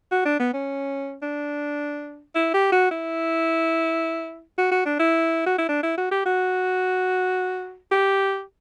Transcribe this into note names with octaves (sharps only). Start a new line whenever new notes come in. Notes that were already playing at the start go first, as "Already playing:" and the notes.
F#4
D4
B3
C#4
D4
E4
G4
F#4
E4
F#4
F#4
D4
E4
F#4
E4
D4
E4
F#4
G4
F#4
G4